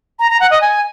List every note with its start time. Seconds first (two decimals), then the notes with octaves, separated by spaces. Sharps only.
0.19 A#5
0.30 A#5
0.40 F#5
0.51 D#5
0.61 G#5